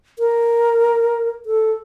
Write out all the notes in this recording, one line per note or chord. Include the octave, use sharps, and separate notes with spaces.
A#4
A4